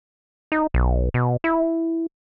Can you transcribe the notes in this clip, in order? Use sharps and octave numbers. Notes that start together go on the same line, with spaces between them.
D#4
B1
B2
E4